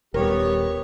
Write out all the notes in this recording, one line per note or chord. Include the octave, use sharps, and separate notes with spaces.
D#1 G3 B3 G4 A#4 C#5